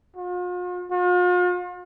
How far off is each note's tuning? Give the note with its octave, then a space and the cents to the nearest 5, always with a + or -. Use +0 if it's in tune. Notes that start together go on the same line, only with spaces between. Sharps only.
F4 +45
F4 +45